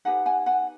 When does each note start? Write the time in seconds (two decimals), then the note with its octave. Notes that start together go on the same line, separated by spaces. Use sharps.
0.05 D#4 G4 B4 F#5 G#5
0.26 F#5 G#5
0.46 F#5 G#5